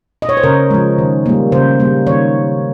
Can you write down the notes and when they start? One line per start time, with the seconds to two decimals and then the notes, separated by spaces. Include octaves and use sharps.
0.22 D#5
0.29 C#5
0.37 C5
0.43 C#3 A#4
0.71 F3 G#3
0.98 D#3
1.26 G3 A#3
1.52 C#3 C5
1.80 G3 A#3
2.07 D#3 C#5